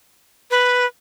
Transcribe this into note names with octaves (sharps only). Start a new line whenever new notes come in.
B4